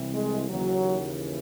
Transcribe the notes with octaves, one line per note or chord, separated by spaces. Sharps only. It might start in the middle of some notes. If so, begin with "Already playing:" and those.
Already playing: C2 C3 E3
G#3
D#2 C#3 E3 F#3